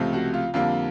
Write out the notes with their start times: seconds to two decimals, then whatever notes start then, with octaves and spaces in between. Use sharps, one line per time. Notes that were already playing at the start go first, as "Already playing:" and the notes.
Already playing: C#2 C3 F3 A3 C4
0.13 F#4
0.34 F4
0.54 F2 D3 G3 A#3 F4